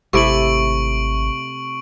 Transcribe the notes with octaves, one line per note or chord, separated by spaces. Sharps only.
G#1 C3 A3 E4 C#6 D7 F#7